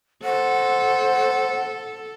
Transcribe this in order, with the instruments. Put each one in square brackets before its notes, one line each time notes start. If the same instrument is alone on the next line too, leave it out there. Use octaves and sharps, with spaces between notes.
[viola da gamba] A4 [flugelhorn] C5 [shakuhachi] F#5